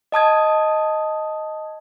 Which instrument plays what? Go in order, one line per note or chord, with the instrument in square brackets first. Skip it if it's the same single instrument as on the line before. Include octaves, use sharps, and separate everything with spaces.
[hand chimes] D#5 A5 D#6 G#6